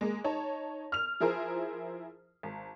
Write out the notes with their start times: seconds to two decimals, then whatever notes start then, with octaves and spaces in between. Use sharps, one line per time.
0.01 G#3 A#3
0.24 D#4 C#5 A5
0.92 F6 F7
1.20 F3 E4 G#4 A#4 C5
2.43 G#1